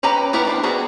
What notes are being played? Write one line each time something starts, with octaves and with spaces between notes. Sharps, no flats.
C#4 G4 B4 G5 A#5
B3 E4 G4 A#4 F#5
E3 D4 C5
G3 B3 F#4 G#4